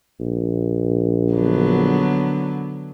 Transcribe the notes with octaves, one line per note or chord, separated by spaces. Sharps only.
A#1
D3 F#3 B3